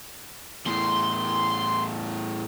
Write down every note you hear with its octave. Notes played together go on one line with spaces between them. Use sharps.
E2 A2 C6